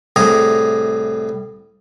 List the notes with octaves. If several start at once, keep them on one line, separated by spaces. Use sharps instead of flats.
C2 A2 G#4 A#5